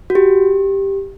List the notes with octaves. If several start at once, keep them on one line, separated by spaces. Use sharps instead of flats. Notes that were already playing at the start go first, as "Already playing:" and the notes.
F#4
G4